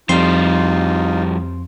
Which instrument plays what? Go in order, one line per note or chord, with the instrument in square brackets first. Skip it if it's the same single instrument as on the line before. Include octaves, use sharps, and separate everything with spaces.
[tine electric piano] F2 C4 C6 [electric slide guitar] F3 G3 [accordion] D#4 F4